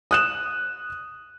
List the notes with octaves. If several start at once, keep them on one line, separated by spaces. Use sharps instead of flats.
D#6 F#6 E7